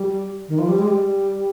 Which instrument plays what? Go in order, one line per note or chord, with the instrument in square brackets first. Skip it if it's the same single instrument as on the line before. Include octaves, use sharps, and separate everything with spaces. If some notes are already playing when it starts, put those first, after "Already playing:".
Already playing: [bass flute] G3
D#3
F3
G3
G#3
G3